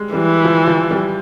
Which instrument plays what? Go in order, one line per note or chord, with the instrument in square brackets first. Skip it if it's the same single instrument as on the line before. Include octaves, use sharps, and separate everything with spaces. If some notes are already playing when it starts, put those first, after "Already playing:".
Already playing: [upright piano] G3 G#3
[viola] E3 [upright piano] G3
[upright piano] F3
F3
G3